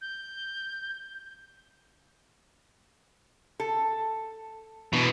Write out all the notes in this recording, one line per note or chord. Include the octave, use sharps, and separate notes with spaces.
G6
A4
B2 E3